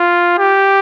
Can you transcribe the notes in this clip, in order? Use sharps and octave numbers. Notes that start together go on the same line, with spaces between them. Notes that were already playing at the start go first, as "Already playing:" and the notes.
Already playing: F4
G4